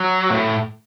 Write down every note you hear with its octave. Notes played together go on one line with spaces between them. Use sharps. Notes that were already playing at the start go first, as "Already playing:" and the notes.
Already playing: F#3
A2